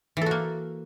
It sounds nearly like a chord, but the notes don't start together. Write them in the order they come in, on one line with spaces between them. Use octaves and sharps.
E3 A4 F#4 A#3